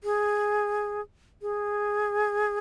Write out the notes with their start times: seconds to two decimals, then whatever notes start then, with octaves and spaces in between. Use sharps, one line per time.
0.04 G#4
1.42 G#4